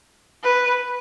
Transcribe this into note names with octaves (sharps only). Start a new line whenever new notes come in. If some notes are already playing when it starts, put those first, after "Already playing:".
B4